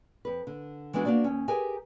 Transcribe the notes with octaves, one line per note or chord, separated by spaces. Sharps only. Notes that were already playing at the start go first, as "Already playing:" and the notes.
F2 B4
D3
E3 G#3 B3 D4 D#4 F#4
A#3 B3 D4 F#4 D5
D#2 C#4
G4 G#4 A#4 B4 G#5